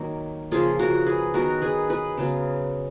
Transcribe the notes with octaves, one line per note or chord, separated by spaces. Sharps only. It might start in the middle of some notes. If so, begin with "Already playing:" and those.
Already playing: D#3 F#3 A#3
C#3 F3 A#3 F4 G#4
F#4 A#4
G#4 B4
D#3 F#3 B3 F#4 A#4
G#4 B4
G#4 B4
C#3 F#3 B3